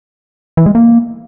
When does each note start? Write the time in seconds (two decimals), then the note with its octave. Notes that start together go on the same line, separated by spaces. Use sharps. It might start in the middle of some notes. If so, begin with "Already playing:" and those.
0.57 E3
0.66 G#3
0.75 A#3